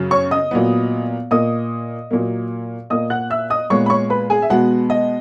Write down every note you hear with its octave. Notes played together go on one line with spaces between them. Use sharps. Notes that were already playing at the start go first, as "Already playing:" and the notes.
Already playing: F#2 C#3 F#3
C#5 C#6
D#5 D#6
A#2 F#3 B3
A#2 A#3 D#5 D#6
A#2 F#3 A#3
A#2 A#3 D#5 D#6
F#5 F#6
E5 E6
D#5 D#6
A#2 G#3 B3 C#5 C#6
B5
C#5 C#6
B4 B5
G#4 G#5
E5
B2 G#3 B3 F#4 F#5
D#5